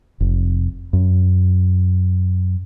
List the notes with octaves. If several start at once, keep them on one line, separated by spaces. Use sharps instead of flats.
F1
F#2